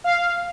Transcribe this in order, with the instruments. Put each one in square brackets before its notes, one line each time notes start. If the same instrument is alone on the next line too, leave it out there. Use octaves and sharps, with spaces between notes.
[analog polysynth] F5